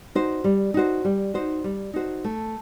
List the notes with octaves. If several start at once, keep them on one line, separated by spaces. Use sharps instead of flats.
D#4 F#4 C5
G3
D#4 F#4 C5
G3
D#4 F#4 C5
G3
D#4 F#4 C5
A3